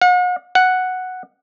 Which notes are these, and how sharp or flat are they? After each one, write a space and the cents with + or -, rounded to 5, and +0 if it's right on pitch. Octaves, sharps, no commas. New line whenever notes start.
F#5 -40
F#5 +0